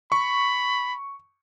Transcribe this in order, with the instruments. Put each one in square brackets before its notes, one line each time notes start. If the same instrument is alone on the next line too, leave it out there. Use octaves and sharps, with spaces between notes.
[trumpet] B5 [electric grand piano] C#6